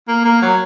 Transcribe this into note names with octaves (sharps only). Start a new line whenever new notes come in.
A#3
A#3
F#3